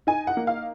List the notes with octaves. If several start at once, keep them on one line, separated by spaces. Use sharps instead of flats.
D#4 G#5
F#5
A#3
F5